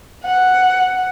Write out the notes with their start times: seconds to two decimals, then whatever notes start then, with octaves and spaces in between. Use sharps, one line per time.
0.23 F#5